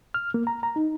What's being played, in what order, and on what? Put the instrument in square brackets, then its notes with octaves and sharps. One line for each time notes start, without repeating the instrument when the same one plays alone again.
[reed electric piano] F6
A#3
A#5
A#5
D#4